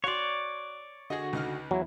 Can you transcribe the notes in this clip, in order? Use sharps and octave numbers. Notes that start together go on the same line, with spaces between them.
F#4 C#5 D5 C6
D3 F#4 G#4 D#5 A#6
C#2 D#4 F6
E2 F#3 E4